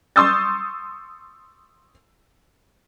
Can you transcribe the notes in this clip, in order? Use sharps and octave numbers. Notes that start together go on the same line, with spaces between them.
C6 C#6 D#6 E6 G6 A6